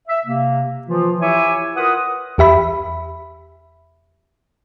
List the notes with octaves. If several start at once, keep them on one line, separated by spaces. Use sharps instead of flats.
E5
C3 A#3
E3 F3 F4
E4 G4 C#5 E5 G#5 D6
F4 A#4 B4 F#5 D#6
E2 G4 E5 B5